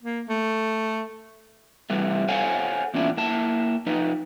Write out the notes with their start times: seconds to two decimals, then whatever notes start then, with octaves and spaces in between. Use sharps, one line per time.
0.03 A#3
0.29 A3
1.90 C3 E3 G3 A3
2.28 A4 C5 C#5 F5 F#5 G#5
2.94 E2 A#2 C#4 D4 E4
3.17 A#3 E4 A5
3.86 F3 D#4 B4